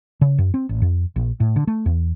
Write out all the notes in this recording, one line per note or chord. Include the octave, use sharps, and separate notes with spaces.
C#3
F#2
C4
A1
F2
A#1
A2
D3
A3
E2